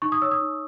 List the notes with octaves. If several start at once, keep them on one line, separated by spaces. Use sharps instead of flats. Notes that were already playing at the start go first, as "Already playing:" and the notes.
D#4 C#6
D#6
C#5 E6
D#6
D#4